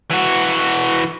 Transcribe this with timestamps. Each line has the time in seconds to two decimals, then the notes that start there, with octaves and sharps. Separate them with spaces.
0.11 E3 F#4